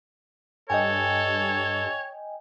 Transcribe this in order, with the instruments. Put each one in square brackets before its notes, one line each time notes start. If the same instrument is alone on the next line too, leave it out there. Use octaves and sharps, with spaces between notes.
[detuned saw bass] G2 [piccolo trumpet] A4 [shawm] C#5 [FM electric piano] D#5 G5 G#5